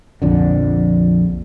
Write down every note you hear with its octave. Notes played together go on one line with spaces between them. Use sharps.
A#1 F2 D3